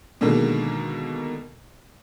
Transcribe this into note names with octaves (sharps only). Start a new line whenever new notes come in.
B2 D3 D#3 G#3 A#3